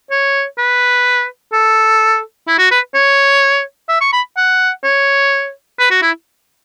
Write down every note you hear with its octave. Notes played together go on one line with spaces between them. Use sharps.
C#5
B4
A4
E4
F#4
B4
C#5
E5
C#6
B5
F#5
C#5
B4
F#4
E4